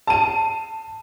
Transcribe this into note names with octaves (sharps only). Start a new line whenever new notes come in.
A5 D#7